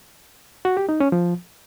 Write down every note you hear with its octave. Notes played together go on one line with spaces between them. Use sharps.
F#4
G4
D#4
C#4
F3